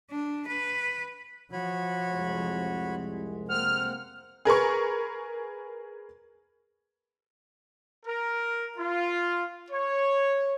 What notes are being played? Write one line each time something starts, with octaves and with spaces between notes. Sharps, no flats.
D4
B4
F3 F#4 C#5 B5
C2 F2 G#3
A#3 C4 F#5 F6
G#4 A#4 B4 C#6
A#4
F4
C#5